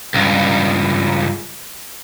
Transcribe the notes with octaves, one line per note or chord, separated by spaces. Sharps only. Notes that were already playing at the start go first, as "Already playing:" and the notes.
C#2 G2